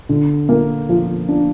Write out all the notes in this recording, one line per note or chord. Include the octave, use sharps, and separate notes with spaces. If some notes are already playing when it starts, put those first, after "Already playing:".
D3
A#3
F3
D4